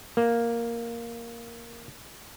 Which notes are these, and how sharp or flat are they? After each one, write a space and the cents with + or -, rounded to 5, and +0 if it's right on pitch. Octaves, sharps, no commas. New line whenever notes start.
A#3 +0